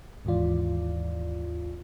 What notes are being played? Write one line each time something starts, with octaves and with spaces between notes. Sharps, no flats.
D#2 G#2 E3 F4 D5